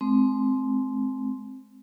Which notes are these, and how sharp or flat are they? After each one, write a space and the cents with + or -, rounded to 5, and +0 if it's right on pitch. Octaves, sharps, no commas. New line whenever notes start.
G#3 +40 C4 +0